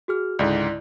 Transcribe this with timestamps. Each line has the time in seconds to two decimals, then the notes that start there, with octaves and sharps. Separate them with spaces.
0.08 F#4 G#4 F6
0.39 C#2 G#2 D3 E4 D5